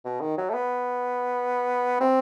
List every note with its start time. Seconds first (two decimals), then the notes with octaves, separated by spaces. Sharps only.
0.05 B2
0.21 D#3
0.37 F#3
0.50 A3
0.54 B3
2.01 C4